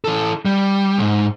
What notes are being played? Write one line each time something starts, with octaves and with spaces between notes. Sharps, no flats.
E3 A4
G3
C#2 G#2